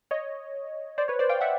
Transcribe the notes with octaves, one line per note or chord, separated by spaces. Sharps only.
C#5 D#5
C5 D5
B4 C#5
C5 D5
F5 G5
E5 F#5